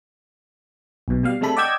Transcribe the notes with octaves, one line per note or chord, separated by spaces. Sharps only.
B1 B2
B2 G3 F5
C3 G#3 A3 D4 A4 B5
D5 D#5 F#5 G5 E6 G#6